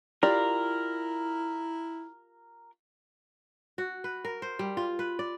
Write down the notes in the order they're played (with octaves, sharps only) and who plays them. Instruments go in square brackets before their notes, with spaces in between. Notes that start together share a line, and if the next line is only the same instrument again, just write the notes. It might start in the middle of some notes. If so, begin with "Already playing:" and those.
[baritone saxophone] E4 [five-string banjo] F4 G4 D5 [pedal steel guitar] A#4
[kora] F#4
B4
A#4
C5
G3
F4
B4
D5